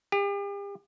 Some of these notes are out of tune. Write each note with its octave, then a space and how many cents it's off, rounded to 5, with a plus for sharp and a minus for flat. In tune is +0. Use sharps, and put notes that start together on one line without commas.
G4 +40